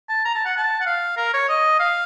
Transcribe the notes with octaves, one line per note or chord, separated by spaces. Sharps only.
A5
A#5
A5
F#5
A5
F#5
F5
A#4
C#5
D#5
F5